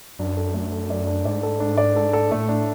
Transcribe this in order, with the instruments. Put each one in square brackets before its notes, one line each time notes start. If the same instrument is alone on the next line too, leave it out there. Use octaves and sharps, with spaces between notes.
[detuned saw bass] F#2 [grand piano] D4
[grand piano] A4
A3
A4
D5
D4
[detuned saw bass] G#2 [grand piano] D5
[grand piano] A4
D4
D5
A4
A4
[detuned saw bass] A2 [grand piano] A3
[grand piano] D4